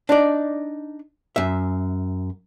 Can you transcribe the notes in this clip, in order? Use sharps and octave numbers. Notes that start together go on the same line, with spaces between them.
D4 D#4 D5
F#2 E5